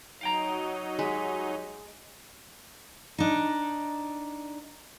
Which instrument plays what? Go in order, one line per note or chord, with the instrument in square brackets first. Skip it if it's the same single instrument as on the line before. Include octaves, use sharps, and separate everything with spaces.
[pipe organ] F#3 D#4 [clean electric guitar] F5 G5 A#5
[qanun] G#3 [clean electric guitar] G4
[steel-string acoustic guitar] D4 D#4